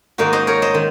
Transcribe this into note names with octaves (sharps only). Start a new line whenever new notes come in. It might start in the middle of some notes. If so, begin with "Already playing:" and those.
G#2 D#3 A#3 D#4 F#4
C5 D#5
A#4 C#5
C5 D#5
D#3